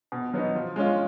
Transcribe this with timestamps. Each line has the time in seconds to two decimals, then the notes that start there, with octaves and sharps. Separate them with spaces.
0.12 B2
0.34 F#3 B3 D#4
0.55 F3
0.76 G#3 C#4 F4